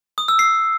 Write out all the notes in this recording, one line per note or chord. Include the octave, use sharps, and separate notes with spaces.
D#6
E6
C7